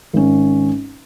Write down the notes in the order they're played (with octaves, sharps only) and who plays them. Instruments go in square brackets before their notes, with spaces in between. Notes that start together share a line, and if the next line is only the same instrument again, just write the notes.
[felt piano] G#1 C#4